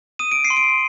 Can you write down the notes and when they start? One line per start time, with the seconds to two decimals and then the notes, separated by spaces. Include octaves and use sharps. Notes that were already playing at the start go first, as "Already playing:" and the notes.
0.19 D#6 D#7
0.32 D7
0.45 C7
0.50 C6
0.57 D7